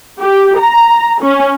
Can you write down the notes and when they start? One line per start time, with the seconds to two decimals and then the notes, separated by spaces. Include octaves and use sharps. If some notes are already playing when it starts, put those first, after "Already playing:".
0.21 G4
0.58 A#5
1.23 C#4